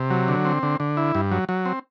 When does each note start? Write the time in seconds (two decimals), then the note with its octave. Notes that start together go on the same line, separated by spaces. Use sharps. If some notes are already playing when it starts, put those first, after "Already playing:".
Already playing: C3
0.10 F#3
0.28 D3
0.45 C4
0.63 D3
0.80 D3
0.97 E4
1.15 G2
1.31 F#3
1.49 F#3
1.65 C4